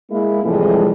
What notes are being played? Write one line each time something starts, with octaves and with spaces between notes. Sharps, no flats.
G#3 A#3 E4
A2 C3 E3 F3 G3 G#3